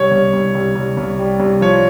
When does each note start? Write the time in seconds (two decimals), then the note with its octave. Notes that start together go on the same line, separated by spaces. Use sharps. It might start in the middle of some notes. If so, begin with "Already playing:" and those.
Already playing: C2 C#5
0.11 C2
0.33 C2
0.55 C2
0.75 C2
0.97 C2
1.19 G3
1.40 C2
1.61 F3 C#5